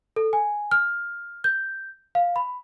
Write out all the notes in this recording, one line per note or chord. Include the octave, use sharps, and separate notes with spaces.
A4
G#5
F6
G6
F5
B5